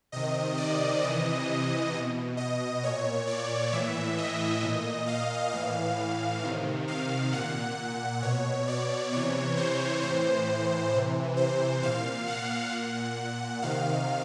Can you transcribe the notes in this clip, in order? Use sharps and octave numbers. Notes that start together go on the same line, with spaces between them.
C3 D#3 D#5
D5
C3 E3 D#5
B2
D#5
A#2 C#5
D5
A2 E3 E5
D#5
A#2
F5
A2 E3 F5
C3 D#3
F5
A#2 F#5
B2 C#5
D5
C3 E3 C#5
C5
A2 E3 C5
C3 E3
C5
A#2 F5
F#5
A#2
C3 D#3 F5